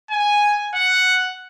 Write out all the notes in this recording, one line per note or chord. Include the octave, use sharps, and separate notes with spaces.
G#5
F#5